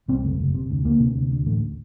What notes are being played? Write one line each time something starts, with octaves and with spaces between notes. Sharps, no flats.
C2 C4
F#1 A3
F#1
C3
D2
D2 A#3
C3
D2
D2
A1 A3